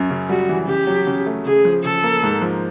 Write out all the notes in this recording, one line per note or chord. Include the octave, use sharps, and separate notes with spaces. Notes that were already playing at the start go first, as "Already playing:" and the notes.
Already playing: F#2
C#3
G3 F#4
E3
C#3 G4
F#3
C#3
A3
C#3 G#4
F3
C#3 A4
A#3
G#2
F3